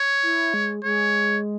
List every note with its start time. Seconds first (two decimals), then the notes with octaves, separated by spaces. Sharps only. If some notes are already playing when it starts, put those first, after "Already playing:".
Already playing: C#5
0.23 E4
0.54 G#3
0.83 G#3 C#5